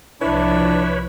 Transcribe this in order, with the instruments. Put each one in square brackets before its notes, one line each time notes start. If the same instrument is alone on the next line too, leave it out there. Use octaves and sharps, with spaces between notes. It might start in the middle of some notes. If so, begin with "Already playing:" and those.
[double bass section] C2 F3 [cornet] D4 [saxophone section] E4 [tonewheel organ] B4 C#5